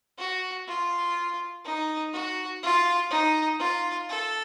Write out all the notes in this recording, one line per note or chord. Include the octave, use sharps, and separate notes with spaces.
F#4
F4
D#4
F#4
F4
D#4
F4
A4